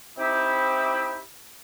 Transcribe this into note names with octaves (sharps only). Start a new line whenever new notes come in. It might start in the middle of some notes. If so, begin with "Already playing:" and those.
C4 D#4 E4 G4